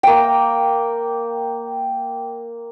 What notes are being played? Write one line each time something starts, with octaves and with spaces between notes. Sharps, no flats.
A#3 G5